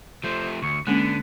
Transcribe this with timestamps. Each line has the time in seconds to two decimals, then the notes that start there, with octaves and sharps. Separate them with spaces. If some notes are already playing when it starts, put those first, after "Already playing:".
0.24 F3 A3 C5
0.62 D2 C#6
0.87 D3 G#3 A#3 B3 C#4